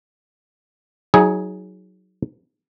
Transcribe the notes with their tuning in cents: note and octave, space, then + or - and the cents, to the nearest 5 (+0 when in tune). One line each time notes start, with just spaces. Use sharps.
F#3 +0 D#4 +35 G#4 +0